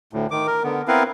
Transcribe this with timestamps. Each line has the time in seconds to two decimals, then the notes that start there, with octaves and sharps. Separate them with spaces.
0.13 D2 A2
0.31 D#3 D6
0.47 A#4
0.64 D3 B3
0.88 B3 C4 E4 A#4 B4 F5